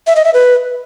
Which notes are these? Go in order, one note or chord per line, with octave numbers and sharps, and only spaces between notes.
E5
D#5
E5
B4